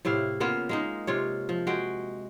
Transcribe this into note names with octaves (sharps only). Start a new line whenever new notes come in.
A2 C3 E4 F5
C#3 A#3 B3 F4
G#3 A#3 D#4
C3 F4 C#5
F3
G#3 F#4 G5